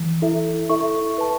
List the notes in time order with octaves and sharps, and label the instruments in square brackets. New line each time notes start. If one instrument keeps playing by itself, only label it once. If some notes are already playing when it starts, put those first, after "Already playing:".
Already playing: [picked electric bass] E3
[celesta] E4 A4 E5
E4 A4 E5 C#6
B4 A5 C#6